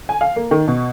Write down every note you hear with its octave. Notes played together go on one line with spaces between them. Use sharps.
G#5
F5
A#3
D#3
B2